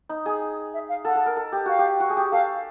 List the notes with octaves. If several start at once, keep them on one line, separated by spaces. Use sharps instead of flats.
D#4
G#4
E5
F5
A4 F#5
A4
A#4
A4
G4
F#4 F5
G4
F#4
G#4
G4
A4 F5